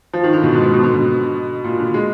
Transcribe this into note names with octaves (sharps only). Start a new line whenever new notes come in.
F3
D#3
D3
B2
G#2
G#2
B2
D3
B2
A#2
D3
G#3